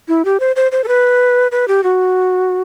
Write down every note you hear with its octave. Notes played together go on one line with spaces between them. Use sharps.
E4
G4
C5
C5
C5
A4
B4
B4
G4
F#4